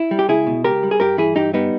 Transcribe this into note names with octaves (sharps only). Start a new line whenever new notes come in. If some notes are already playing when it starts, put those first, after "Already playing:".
Already playing: E4
G3
G4
C#2 E4 G#4
B2
C#2 G4 A#4
G3
G#4
G2 G4 A#4
E3 E4 G#4
G2 D#4 G4
G3 B3 D#4